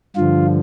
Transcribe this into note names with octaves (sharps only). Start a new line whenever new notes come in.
G2 D3 F3 F4